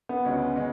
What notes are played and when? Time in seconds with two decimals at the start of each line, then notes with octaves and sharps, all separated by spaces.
0.09 B3
0.25 D2 C#3 G#3 C#4
0.56 C#3 G#3 C#4